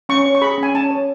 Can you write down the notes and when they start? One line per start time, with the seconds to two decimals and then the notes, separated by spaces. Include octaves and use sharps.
0.09 C#4 C#6
0.26 C#5
0.35 C#6
0.41 G#4 B5
0.58 C#4 G#5
0.74 C#4 A5
0.91 C#5